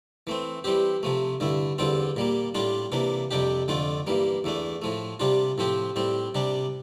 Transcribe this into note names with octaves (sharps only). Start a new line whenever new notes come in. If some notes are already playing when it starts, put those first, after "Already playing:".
E3 A3 C4
E3 G3 C4 G4
C3 F3 A3
G2 D3 A3 E4
E2 D3 G3 C4 F4
A#2 G3 A#3
A2 G3 D4 F4
C3 E3 A#3 D4
F2 C3 G3 D4 G4
F2 D3 A3 D4 F4
G2 E3 G3 A#3
E2 E3 A3 D4
A2 F3 A3
C3 G3 D4 F4
A2 F3 C4 G4
A2 G3 C4
C3 G3 D4